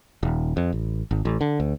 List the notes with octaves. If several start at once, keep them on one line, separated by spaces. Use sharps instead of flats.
D#1
F2
A1
G#1
A1
D3
D2